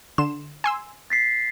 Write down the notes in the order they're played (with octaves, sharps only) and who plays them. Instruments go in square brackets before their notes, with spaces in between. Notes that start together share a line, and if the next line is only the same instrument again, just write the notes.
[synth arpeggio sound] D3 C6 E7
G#5 C6 E6
[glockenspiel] A6 B6 C7